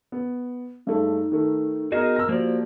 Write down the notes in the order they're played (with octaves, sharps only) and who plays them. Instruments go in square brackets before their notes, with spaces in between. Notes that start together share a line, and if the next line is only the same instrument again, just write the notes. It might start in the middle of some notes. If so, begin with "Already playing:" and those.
[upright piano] B3
[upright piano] G2 G#3 A3 [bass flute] D#4
[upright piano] D#3 A3
[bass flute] B3 [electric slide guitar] D#4 F#4 G#4 [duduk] A#4 [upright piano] D#5
[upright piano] E6 A#6
[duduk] F3 [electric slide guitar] A#3 G4 D5 [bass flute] F#4